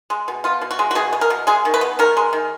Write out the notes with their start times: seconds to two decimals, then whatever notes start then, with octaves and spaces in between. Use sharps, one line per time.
0.10 G#3
0.28 B2
0.44 B3 F4
0.62 B2
0.71 F#4
0.79 G#3
0.91 F#4
0.95 B2 G#4
1.13 B3
1.21 A#4
1.30 B2
1.47 G#3 G#4
1.65 D#3
1.74 B4
1.81 B3
1.99 D#3 A#4
2.17 G#3
2.33 D#3